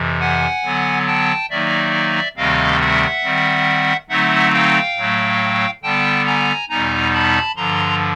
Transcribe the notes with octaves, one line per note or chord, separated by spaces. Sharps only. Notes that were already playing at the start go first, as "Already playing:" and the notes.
Already playing: F2 C3 E3
F#5 G#5
D3 F#3 B3
G5 A5
D#3 F#3 A#3 D#4 D5 E5
D2 C3 D#3 G3 C4 D#5 F5
E5 F#5
D#3 G3 C4
D3 F#3 A3 C4 D#4 E5 F#5
F5 G5
A2 F#3 A3
D3 G3 B3 G5 A5
G#5 A#5
E2 B2 G3 B3 D#4 G#5 A#5
A5 B5
G2 D3 F3 A#5 C6